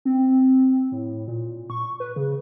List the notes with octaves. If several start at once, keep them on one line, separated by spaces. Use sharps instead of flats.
C4
A2
A#2
C#6
B4
C#3